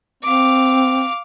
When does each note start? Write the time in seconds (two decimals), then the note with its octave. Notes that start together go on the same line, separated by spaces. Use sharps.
0.23 C4 F5 D6